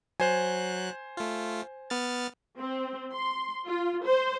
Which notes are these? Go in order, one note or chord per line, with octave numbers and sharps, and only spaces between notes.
F#3 C5 G#5 F#6
A3 F4
B3 F6 A6
C4
C6
F4
C5